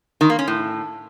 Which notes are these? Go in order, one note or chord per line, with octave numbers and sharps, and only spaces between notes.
D#3
A#3
C#4
A2